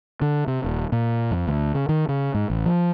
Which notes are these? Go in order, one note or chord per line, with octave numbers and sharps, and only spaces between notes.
D3
C3
D#1
A#2
F2
D2
C#3
D#3
C#3
G#2
A1
F3